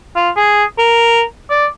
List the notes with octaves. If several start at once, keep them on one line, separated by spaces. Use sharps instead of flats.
F4
G#4
A#4
D5